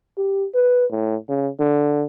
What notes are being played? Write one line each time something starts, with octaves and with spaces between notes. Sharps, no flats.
G4
B4
A2
C#3
D3